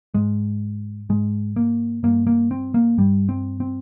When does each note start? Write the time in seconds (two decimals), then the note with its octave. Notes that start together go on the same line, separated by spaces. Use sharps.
0.14 G#2 G#3
1.09 G#2 G#3
1.56 A#3
2.03 G2 A#3
2.27 A#3
2.51 C4
2.74 A#3
2.98 G2 G3
3.29 C4
3.60 C4